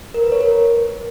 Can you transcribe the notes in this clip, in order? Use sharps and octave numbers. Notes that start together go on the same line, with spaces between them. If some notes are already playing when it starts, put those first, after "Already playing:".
A#4
B4
C#5
A#4